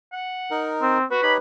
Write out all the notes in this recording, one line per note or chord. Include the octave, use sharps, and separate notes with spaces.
F#5
D#4 A#4
C4
F#4 B4
D#4 G4 C#5 B5